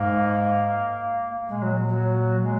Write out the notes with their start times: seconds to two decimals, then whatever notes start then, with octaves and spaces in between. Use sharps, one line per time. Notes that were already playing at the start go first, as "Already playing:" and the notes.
Already playing: G#2 A#3
1.49 A#2 G#3
1.62 F#3
1.88 F#3
2.42 G#3